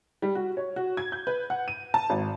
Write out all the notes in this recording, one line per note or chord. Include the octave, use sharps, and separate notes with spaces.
G3
F#4
C#5
F#4
G#6
G6
B4
F#5
D#7
A5
G#1